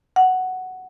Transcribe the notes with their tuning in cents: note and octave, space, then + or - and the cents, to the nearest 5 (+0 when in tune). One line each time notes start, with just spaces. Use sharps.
F#5 +5